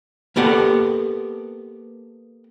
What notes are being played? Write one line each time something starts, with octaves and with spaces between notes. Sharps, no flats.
A#3 B3 G4 A4 F#5